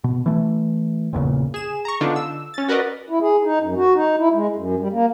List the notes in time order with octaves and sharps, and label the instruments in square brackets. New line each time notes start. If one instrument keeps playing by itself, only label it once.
[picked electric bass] B2
E3 A3
G1 E2 A#2 C#3
[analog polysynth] G#4 E7
A#5 C#6
D3 B3 D4 D#4 F4
E6
C#4 A6
F#4 A#4 B4 D5 D#5
[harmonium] E4
G#4
D#4
F#2
F#4
D#4
E4
G#3
F#2
G3
A#3